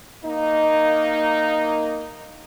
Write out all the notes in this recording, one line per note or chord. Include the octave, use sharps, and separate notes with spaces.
A#3 D#4